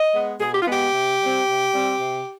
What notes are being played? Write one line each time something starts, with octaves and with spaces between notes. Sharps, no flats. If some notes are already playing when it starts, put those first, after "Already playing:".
Already playing: D#5
G#3 B3
B2 G#4
G4
F4
G#3 B3 G4
C3
G3 C4
C3
G3 C4
C3